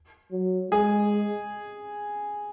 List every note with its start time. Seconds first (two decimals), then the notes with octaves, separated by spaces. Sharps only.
0.32 F#3
0.72 G#3 G#4